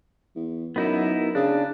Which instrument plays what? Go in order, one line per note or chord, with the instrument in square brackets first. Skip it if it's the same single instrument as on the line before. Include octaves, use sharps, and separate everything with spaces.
[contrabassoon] E2
[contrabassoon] F#2 [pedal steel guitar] B3 D#4 E4
[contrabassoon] C#3 [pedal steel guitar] D4